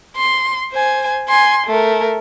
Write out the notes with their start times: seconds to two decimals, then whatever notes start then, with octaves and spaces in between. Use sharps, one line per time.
0.16 C6
0.72 C5 G#5
1.29 G#5 C6
1.67 A3 A#4